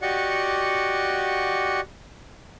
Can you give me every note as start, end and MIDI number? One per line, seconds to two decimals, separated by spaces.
0.02 1.80 66
0.02 1.80 67
0.02 1.80 74
0.02 1.80 75
0.02 1.80 78
0.02 1.80 85